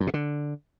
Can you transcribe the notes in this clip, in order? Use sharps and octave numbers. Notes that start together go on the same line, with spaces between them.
F#2
B2
D3